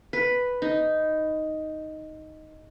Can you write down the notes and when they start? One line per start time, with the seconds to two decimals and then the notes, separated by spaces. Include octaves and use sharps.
0.13 B4
0.62 D#4